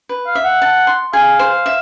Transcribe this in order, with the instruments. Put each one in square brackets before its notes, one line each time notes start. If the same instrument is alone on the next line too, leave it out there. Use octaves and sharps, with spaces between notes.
[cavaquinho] B4
[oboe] F5
[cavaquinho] E5
[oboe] F#5
[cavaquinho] A5
C6
[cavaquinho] G#4 [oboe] F5
[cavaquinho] C5
E5